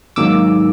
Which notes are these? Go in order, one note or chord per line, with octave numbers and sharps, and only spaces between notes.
G#2 D#3 F#3 A#3 D6 E6